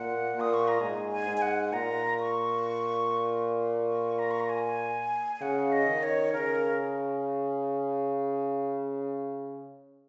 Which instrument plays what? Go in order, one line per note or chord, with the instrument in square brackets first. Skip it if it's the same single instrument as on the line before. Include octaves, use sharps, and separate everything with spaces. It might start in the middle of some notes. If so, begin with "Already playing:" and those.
Already playing: [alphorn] A#2 [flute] F#5
[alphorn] A#2 [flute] D#6
[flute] C#6
A#5
[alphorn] G#2 [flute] G#5
[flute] G#5
[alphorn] G#2
[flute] G#5
F#5
[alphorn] A#2 [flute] A#5
[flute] C#6
C#6
A#5
C#6
A#5
G#5
G#5
[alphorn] C#3 [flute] F#5
[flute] D#5
[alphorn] D#3
[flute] C#5
[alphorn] C#3 [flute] A#4